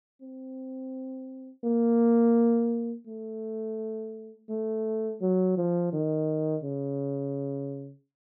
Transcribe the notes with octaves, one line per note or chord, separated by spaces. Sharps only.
C4
A#3
A3
A3
F#3
F3
D#3
C#3